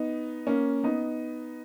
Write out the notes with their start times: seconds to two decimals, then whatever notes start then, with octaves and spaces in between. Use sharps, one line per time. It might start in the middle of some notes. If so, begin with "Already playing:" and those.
Already playing: B3 D#4
0.47 A#3 C#4
0.84 B3 D#4